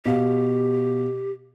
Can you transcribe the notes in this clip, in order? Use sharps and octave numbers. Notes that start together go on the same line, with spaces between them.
B2 G4 F5